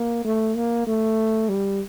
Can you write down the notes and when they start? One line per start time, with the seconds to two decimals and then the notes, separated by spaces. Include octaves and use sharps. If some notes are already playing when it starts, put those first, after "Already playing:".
Already playing: A#3
0.25 A3
0.56 A#3
0.87 A3
1.49 G3